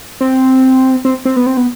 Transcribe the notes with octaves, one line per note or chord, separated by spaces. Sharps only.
C4
C4
C4
B3
C4
B3